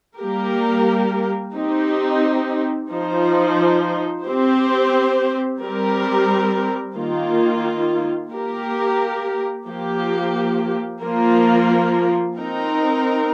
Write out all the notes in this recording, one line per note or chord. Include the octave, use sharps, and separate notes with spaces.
G3 A#3 G4 A#4
C4 D#4 G4
F3 D#4 C5
C4 G4 C5
G3 C4 G4 A#4
D#3 A#3 F4
A#3 G4 A#4
F3 A#3 G4
F3 A#3 F4 A#4
C4 D#4 A#4